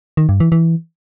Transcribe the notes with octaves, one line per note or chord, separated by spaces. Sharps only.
D#3
G2
E3
E3